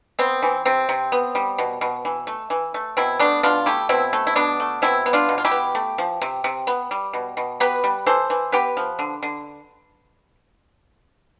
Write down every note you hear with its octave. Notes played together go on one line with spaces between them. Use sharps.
B3 C4
E3
C3 C4
C3
B3
G3
B2
B2
E3
A3
E3
A3
B2 C4 E4
A3 B3 D4
B2 D4 F4
A3 E4 G4
B2 C4 E4
A3
E4
B2 B3 D4
A3
B2 C4 E4
B3
D4 F4
B2
F4
E4 G4
B3
A3
F3
C3
C3
B3
G3
B2
B2
B3 G4 B4
G3
E3 A4 C5
E3
B3 G4 B4
F3
D3
D3